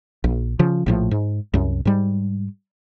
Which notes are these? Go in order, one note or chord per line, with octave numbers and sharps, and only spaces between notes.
A#1
C#3 F3
A#1 A2 F3
G#2
C2 F#2
G#2 G3